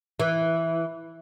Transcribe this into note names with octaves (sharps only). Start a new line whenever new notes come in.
E3